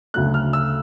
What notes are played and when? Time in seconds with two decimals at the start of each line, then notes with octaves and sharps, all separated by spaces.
0.14 D2 C#3 F#3 A3 F#6
0.34 F6
0.53 E6